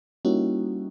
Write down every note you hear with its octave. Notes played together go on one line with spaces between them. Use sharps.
G3 A#3 C#4 D#4 E4 F#4